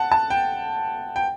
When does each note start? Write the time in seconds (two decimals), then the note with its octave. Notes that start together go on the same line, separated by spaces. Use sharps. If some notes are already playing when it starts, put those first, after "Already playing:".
Already playing: F#5 A5
0.12 A5
0.30 G5
1.16 G5